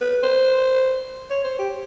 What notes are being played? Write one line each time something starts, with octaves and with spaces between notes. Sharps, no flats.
B4
C5
C#5
C5
G4